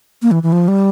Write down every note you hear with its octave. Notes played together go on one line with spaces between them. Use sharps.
A#3
E3
E3
F3
G3